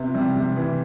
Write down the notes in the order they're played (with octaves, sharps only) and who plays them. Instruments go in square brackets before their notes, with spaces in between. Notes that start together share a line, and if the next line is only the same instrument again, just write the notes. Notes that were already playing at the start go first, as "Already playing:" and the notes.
Already playing: [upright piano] C3 B3
[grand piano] F3
[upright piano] C3 [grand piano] G3
[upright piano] C3 [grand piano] G3
[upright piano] E3